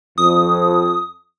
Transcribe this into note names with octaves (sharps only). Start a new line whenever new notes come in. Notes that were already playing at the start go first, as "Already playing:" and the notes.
F2 D#6